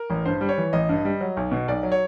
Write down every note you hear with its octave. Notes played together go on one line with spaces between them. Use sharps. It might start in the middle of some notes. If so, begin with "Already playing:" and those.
Already playing: A#4
A1
G2 C5
G3
C#5
E3
A1 D#5
G2
G3
F#3
B1
B2
B1 D5
F#3
C#5